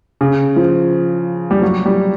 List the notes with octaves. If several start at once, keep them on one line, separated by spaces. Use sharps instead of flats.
C#3
F3
G3
F#3
G3